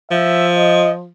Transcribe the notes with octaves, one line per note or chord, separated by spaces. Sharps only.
F3 E5
D#5